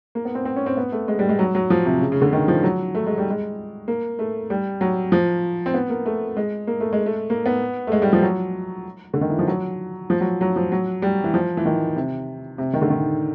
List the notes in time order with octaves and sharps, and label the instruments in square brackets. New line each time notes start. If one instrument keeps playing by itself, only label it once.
[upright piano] A#3
B3
C4
C4
C#4
C4
B3
A3
G#3
G3
G#3
F#3
F#3
F3
C3
C#3
C#3
D3
D#3
F3
F#3
A3
G#3
G3
G#3
A#3
A3
G3
F#3
F3
C4
B3
A#3
A3
G#3
A#3
A3
G#3
A3
A#3
B3
A3
G#3
G3
F3
F#3
D3
D#3
E3
F3
F#3
F3
F#3
F#3
F3
F#3
G3
E3
F3
E3
D#3
C3
C3
D#3
D3
D#3